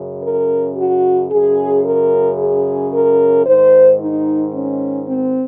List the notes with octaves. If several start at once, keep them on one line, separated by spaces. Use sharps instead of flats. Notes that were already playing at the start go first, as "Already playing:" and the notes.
Already playing: F#2 C#3
A#4
F#4
F#2 C#3 G#4
A#4
G#4
A#4
G#2 D#3 C5
D#4
C#4
C4